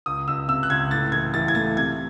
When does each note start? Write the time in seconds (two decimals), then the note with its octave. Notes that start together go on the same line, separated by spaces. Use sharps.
0.06 C#2 D#6
0.27 C#2 E6
0.48 C3 E6
0.63 F#6
0.70 C#2 G#6
0.91 A2 A6
1.12 E3 G#6
1.34 E3 A6
1.48 G#6
1.55 A3 A6
1.77 C3 G#6